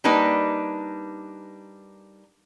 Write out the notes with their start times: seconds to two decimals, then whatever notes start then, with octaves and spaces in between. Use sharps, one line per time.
0.04 G3 A#3 D4 D#4 B4